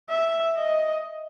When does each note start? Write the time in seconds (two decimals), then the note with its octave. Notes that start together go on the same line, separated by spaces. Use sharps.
0.09 E5
0.57 D#5